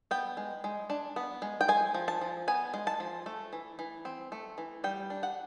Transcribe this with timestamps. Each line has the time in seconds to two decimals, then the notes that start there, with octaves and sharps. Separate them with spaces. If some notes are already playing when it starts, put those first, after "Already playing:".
0.11 B3 G5
0.37 G#3
0.64 G#3
0.90 D4
1.16 B3
1.42 G#3
1.61 G5
1.68 G#3 G#5
1.95 F3
2.08 A5
2.21 F3
2.48 B3 G#5
2.74 G#3
2.87 A5
3.00 F3
3.26 A3
3.53 E3
3.79 E3
4.05 C4
4.32 A3
4.58 E3
4.84 G3 G5
5.10 D4
5.23 F#5